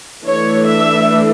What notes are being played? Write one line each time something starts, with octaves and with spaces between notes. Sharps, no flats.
E3 A3 D4 C#5
E5